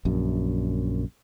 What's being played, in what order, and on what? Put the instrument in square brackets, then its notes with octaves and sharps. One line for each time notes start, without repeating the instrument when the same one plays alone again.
[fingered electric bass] A#1 F#2